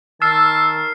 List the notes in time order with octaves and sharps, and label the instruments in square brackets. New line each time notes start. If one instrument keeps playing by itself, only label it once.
[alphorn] D#3 [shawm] A5 [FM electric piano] E6 [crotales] F6 C7